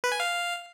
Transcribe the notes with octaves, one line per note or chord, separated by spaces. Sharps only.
B4
G#5
F5